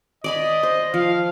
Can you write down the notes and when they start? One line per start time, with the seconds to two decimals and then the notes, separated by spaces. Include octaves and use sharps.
0.24 D5 D#5 G#5 B5
0.63 C5
0.94 F3 F5